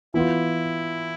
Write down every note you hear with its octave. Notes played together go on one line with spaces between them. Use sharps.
E3 B3 E4 F4